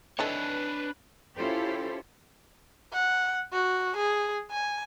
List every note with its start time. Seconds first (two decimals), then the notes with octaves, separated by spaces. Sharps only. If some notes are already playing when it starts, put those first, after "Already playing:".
0.19 D#3 E3 D4 A4 B4 C#5
1.37 C#4 E4 F4 G4 A4 C5
2.93 F#5
3.53 F#4
3.97 G#4
4.51 G#5